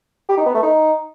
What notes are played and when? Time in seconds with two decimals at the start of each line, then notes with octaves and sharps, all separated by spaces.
0.29 G4
0.37 D#4
0.46 B3
0.54 A3
0.63 D#4